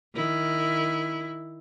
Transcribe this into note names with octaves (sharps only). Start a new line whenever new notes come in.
D#3 E4